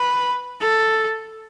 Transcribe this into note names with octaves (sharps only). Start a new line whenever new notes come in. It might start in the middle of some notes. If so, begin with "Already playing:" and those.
Already playing: B4
A4